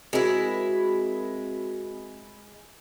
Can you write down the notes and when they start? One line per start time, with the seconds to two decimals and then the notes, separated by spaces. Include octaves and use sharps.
0.13 G#3 C4 E4 F#4 A#4